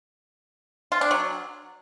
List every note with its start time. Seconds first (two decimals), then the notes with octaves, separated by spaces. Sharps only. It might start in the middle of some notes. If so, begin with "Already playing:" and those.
0.92 F4
1.01 D4
1.11 F#3